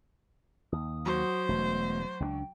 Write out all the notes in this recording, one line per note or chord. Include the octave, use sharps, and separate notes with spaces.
D#2 D#6
F#3 F#4 C5
E1 B2 A3
C#2 G#3 D4 G5